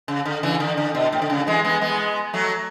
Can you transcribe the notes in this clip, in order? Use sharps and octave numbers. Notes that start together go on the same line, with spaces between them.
C#3
D3
C#3 E3
D3
D3
B2
A2
D3
C#3
E3 G#3
G#3 B3
G#3 B3
F#3 A3